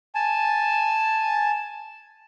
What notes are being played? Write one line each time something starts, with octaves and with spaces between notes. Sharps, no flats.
G#5 A5